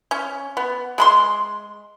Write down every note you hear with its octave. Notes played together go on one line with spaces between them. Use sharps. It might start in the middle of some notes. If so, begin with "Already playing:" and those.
C#4
B3
G#3 B5 C6